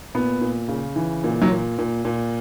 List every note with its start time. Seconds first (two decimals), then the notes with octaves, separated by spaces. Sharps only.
0.15 A#2 B3
0.41 A#2
0.68 C#3
0.96 E3
1.24 A#2
1.42 F#3
1.51 A#2
1.78 A#2
2.05 A#2